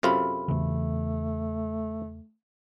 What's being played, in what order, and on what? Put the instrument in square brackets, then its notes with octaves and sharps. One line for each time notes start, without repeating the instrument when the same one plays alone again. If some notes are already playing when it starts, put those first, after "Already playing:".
[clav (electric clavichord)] F#2 C3 F4 [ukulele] A4 B5
[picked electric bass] E2 C#3 E3 [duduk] A3